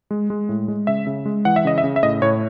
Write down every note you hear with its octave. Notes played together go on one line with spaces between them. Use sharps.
G#3
G#3
A2
G#3
C#3 E5
C#3
G#3
E3 F#5
E5
C#3 D#5
E5
C#3
E5
A2 D#5
A2 C#5